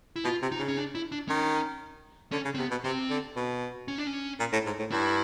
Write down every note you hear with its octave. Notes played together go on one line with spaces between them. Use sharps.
E4
B2 F4
C3
D#4
C#3
C#4
D4
E4
D4
D#3 C#4
D3 C#4
C#3
C4
C3 B3
B2
C3 C4
D3
B2
C#4
D4
C#4
A#2
A2
G#2
A2
G2 E4